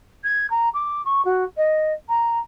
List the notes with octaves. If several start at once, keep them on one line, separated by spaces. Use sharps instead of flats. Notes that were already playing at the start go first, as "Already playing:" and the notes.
G#6
A#5
D6
C#6
F#4
D#5
A#5